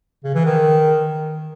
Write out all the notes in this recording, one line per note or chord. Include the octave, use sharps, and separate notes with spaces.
C#3
E3
D#3